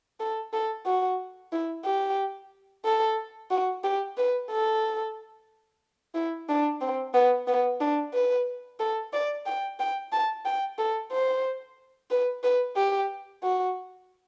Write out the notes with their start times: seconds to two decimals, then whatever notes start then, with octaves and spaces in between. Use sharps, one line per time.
0.20 A4
0.53 A4
0.86 F#4
1.52 E4
1.85 G4
2.85 A4
3.50 F#4
3.84 G4
4.17 B4
4.50 A4
6.15 E4
6.49 D4
6.81 C4
7.14 B3
7.47 B3
7.81 D4
8.14 B4
8.80 A4
9.13 D5
9.46 G5
9.79 G5
10.12 A5
10.45 G5
10.78 A4
11.12 C5
12.10 B4
12.44 B4
12.76 G4
13.43 F#4